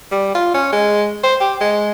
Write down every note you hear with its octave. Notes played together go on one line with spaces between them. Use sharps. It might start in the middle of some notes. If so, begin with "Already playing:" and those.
G3
F4
C#4
G#3
C5
G4
G#3